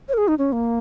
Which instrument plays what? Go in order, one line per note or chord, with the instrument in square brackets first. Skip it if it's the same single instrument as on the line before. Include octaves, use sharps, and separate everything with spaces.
[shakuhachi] C#5
A#4
G#4
D#4
C#4
A#3